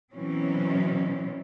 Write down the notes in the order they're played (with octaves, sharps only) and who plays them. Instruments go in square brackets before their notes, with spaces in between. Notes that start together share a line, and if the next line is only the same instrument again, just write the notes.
[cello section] B2 E3 F#3 C4 C#4